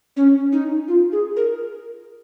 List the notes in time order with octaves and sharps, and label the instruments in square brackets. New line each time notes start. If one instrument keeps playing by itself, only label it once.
[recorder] C#4
D#4
F4
G#4
A#4